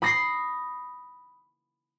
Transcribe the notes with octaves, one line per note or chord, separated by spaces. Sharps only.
B5 D#6 A#6 C7